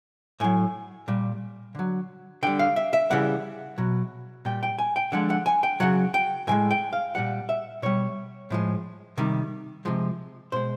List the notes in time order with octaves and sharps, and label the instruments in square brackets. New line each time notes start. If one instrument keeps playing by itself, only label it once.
[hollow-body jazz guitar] A2 F#3 G#5
A#2 G3
D3 F#3
D3 G3 G5
F5
E5
E5
C#3 E3 G3 F#5
B2 F#3
A#2 G3 G5
G5
G#5
G5
D3 F3 G#3 F#5
F#5
G#5
G5
C#3 F#3 F#5
G5
A2 E3 G#3 G#5
G5
F5
A#2 G3 F#5
E5
B2 G3 C#5
A2 F3 G#3
C3 D#3 G3
C3 F3 G#3
B2 G#3 C5